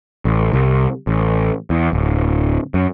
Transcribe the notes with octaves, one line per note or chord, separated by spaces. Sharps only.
A1
C2
A1
E2
D1
F#2